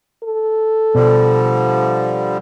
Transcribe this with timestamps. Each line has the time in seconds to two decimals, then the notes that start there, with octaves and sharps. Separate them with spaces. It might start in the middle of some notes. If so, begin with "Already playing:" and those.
0.24 A4
0.95 B2 D3 F3 G3